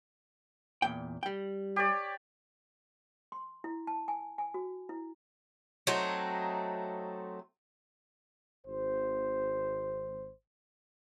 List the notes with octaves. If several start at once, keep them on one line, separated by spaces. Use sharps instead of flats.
E2 A#2 G5
G3 G5
G4 C#5 D5
C6
E4
A5
G#5
G#5
F#4
E4
F#3 A3 C4 D#4
G#1 C5